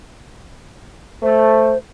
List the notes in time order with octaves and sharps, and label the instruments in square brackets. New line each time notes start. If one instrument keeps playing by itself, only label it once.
[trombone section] A3 [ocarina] C5